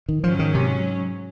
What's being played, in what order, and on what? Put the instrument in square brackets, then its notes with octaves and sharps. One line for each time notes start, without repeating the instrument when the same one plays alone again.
[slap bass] D#3
[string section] G#2 F#3 C#4 [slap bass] F3
[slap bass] D#3
C3